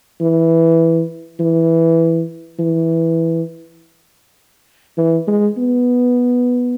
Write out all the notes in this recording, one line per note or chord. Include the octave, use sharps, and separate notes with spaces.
E3
E3
E3
E3
G#3
B3